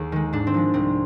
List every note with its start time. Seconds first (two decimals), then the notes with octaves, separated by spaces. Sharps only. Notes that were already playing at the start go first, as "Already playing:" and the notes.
Already playing: D#2 G#4
0.12 D#3 G#3
0.33 G#2 D4
0.47 C4
0.54 F3 G#3
0.74 C2 C4